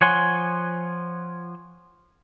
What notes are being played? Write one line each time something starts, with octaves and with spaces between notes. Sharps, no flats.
F3 C#5 F#5 G#5 C6